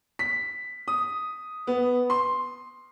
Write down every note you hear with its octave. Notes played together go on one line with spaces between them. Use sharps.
B6
D#6
B3
C6